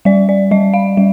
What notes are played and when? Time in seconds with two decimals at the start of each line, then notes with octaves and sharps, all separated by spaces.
0.05 G3 D5
0.29 D5
0.51 G3 D#5
0.74 F5
0.97 G3